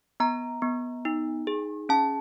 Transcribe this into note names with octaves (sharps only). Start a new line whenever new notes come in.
B3 A#5
B3
D#4
G#4
C#4 A5